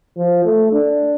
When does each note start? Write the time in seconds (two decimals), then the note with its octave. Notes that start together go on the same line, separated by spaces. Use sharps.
0.17 F3
0.45 A3
0.72 D4